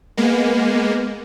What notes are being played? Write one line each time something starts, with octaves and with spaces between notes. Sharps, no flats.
G#3 A#3 B3